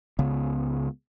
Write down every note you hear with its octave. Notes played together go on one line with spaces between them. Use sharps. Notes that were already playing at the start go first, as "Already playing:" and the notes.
C#2 C#3 B3